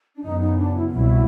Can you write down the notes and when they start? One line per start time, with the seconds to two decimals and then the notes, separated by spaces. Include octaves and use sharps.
0.16 D4
0.23 F#2 C#3 F#3 B3 D#4
0.40 D#4
0.58 D4
0.75 E4
0.87 F4
0.93 C2 B2 F#3 E4